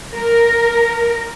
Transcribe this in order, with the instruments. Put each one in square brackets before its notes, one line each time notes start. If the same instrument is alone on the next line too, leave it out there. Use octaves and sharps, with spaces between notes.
[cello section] A#4